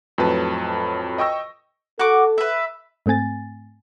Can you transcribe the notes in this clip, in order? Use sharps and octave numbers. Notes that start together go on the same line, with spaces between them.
F2 A2 F#3 B4 A5
D#5 G5 C#6 E6 A#6
F#4 A4 D6
B4 E5
G#2 A3 C4 G#5 A6